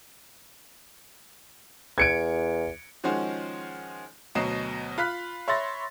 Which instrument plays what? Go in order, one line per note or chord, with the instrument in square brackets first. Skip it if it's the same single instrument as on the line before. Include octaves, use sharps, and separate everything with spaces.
[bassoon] E2 [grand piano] G#6 C#7 D7
[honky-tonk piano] D#3 F3 G#3 C#4 F#4 C5
D2 B2 F#3 D#5 C7 E7
F4 F5 B5 F#6 B6
C#5 E5 B5 C6 A6 A#6